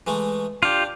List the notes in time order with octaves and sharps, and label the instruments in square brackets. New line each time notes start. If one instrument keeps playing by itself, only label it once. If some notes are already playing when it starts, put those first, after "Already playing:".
[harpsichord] E3 G#3 A3
[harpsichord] D4 [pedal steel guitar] F4 G4